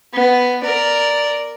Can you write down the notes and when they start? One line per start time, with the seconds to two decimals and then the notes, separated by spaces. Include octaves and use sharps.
0.14 B3
0.63 A#4 D5